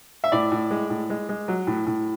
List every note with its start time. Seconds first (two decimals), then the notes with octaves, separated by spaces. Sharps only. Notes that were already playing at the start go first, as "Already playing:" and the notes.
0.24 E5
0.32 A2 D5
0.52 A2
0.71 G#3
0.90 A2
1.10 G#3
1.29 G#3
1.48 F#3
1.67 A2
1.86 A2